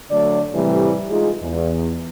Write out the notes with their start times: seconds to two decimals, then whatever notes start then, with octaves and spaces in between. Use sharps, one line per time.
0.11 D3 F#3 A3 D5
0.53 A2 C3 E3 G3
1.10 G#3 D#4 F4 G#4
1.42 E2